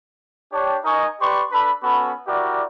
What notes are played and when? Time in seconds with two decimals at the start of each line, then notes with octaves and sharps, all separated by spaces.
0.52 D4 G4 C#5
0.84 D#4 A#4 D#5 G#5 A#5 C#6
1.21 G4 B4 D5 C6 C#6
1.52 D4 A4 B4 B5
1.83 B3 C#4 F#4 A4 B5
2.28 E4 F#4 G4 A#4 D5